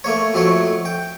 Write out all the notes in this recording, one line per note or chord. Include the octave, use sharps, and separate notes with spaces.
A3 A#3 C#5
F2 F#3 A3 C#5
G5